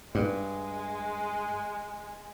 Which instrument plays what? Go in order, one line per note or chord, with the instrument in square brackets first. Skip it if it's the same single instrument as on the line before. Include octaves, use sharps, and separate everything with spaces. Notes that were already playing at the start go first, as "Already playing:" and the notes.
[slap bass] G2 [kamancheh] G#3